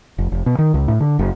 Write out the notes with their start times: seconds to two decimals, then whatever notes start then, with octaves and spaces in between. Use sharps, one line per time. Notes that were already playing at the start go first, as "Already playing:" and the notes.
0.18 F1
0.32 F1
0.46 B2
0.59 D#3
0.74 C#2
0.88 A2
1.00 D3
1.19 F#1